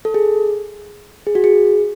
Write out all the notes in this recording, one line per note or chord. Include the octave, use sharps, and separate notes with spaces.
A4
G#4
G#4
F#4
G#4